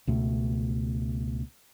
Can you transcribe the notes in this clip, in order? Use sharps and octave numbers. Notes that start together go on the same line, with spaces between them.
C#2 B2 A3